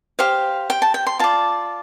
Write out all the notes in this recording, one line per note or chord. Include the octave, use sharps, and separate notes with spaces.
G4 C5 F5
G5
A5
G5
C6
F4 D5 A5